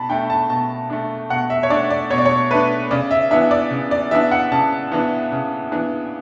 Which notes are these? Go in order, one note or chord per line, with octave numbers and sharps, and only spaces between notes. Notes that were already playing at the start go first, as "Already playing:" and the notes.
Already playing: B2 A5 B5
A3 D4 G5
A5
B2 A5
A3 D4
B2 F#5
E5
C#5
A3 D4 D5
D5
B2 C#5
D5
C#5
A3 D4 B4
C#3 D5
E5
E3 B3 D4 E5
D5
C#3
D5
E3 B3 D4 E5
F#5
C#3 A5
E3 B3 D4
C#3
E3 B3 D4